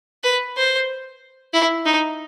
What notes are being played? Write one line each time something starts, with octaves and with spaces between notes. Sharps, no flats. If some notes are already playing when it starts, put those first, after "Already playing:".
B4
C5
E4
D#4